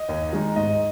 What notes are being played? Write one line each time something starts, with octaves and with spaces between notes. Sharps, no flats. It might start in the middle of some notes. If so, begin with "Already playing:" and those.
Already playing: D#5
D#2
D#3 G#3 D#4
G#2 D#5